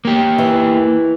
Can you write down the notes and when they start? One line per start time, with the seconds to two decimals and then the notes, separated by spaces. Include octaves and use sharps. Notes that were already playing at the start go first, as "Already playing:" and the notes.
0.05 A#3 G4
0.38 E3